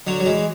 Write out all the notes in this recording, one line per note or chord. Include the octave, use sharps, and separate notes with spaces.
D3 F#3
F#3
E3 G#3